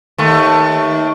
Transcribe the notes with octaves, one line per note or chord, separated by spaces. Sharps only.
D#2 A3